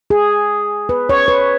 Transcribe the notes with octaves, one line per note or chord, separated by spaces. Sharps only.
G#4
B4
C#5
B4